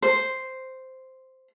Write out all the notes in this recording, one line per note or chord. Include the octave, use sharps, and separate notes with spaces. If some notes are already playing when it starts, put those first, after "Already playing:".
C5